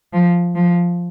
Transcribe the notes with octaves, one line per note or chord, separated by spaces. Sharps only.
F3
F3